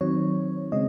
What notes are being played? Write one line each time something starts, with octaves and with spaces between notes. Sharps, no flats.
D#3 F#3 C4 C#5
C#3 G#3 C4 D#5